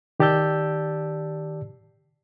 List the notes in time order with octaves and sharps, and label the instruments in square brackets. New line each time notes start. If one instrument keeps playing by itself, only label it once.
[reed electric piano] D#3 G4 D5 A5 E6 G6